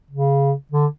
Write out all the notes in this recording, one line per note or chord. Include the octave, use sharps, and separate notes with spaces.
C#3
D3